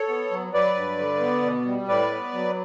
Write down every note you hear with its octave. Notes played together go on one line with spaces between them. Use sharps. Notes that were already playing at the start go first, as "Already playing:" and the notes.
Already playing: A4 C#5
B3
F#3
F#3 B4 D5
G2
D3
B3
B2
G3
A2 B4 D5
B3
F#3